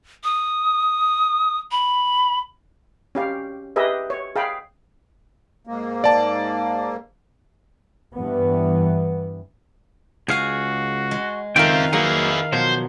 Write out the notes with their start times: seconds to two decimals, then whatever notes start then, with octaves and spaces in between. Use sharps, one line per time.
0.24 D#6
1.71 B5
3.15 C#4 G4 F5
3.76 G4 G#4 B4 D#5 E5
4.10 C#5
4.36 G#4 F5 G5 B5
5.67 G#2 A#3
6.04 D5 A5
8.15 G2 E3 B3
10.28 C#2 F#4 G#4 F5 G#5
11.11 G#3
11.56 C#2 D#3 C4 F4 A#4 E5 F5 G5
11.93 F#3 A#3 D#4 E4 G#4
12.53 B2 F3 F#3 C5